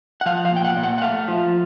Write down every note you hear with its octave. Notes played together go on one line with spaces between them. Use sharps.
F#5
F3 F5
F5
A#2
G5
F#5
A#2
F#5
F#5
A3 F5
F3